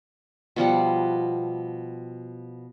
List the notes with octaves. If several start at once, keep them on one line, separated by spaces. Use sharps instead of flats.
B2 F3 G3 F#5